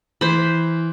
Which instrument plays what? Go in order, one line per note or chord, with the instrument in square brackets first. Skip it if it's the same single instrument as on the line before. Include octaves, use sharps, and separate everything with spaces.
[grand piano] E3 [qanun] C5 B5